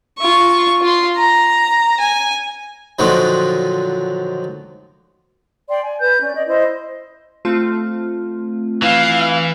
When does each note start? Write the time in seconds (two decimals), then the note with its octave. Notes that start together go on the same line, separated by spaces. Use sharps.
0.18 F4 C#6
0.82 F4 C6
1.17 A#5
2.00 G#5
2.99 A#2 D3 D#3 F3 F#3
5.69 D5 G5 C6
5.83 G#5
5.99 B4 G6
6.21 C#4 D5
6.35 D5 D#5
6.47 E4 C5 D#5
7.45 A3 C4 F4
8.82 E3 F5